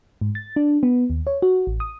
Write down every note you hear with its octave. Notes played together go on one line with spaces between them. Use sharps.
G#2
A6
D4
B3
D#2
C#5
F#4
A1
D#6